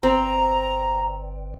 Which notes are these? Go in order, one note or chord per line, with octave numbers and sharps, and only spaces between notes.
G1 C4 A#5